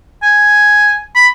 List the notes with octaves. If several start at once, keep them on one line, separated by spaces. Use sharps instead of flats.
G#5
B5